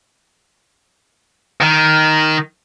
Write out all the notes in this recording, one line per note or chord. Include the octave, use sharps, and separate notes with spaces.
D#3